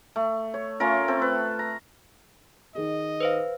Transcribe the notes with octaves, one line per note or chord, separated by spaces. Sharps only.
A3
C#5
A3 C#4 F4 A#4
C4 A4
B4
A#5
D#3 G#4 D#5
B4 C5 F5